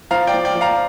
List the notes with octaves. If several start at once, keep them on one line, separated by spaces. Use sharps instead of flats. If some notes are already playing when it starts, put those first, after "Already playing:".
F3 F5 A#5
D5 G5
F3
D5 G5
F3
F5 A#5